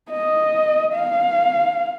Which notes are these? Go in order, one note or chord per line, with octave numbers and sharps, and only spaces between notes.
D#5
F5